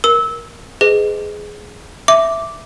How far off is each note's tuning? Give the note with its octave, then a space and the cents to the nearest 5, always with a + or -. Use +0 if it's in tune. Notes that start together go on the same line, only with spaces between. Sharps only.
A#4 +10 E6 -20
G#4 +5 B4 +40 D#5 +0
E5 +0 D6 -5